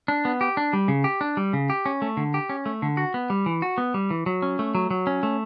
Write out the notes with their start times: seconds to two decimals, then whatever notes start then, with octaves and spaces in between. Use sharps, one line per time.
0.08 D4
0.25 B3
0.41 G4
0.57 D4
0.73 G3
0.88 C#3
1.04 G4
1.21 D4
1.37 G3
1.53 C#3
1.70 G4
1.86 C#4
2.02 A3
2.17 D3
2.34 G4
2.49 C#4
2.66 A3
2.82 D3
2.97 F#4
3.14 B3
3.30 G3
3.46 E3
3.62 F#4
3.78 B3
3.94 G3
4.10 E3
4.26 F#3
4.42 C#4
4.59 A3
4.75 F#3
4.91 F#3
5.07 C#4
5.23 A3